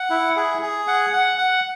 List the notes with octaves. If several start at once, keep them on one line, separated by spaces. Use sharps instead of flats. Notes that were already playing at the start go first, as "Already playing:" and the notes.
Already playing: F#5
E4
G#4
G#4
F#5
F#5
F#5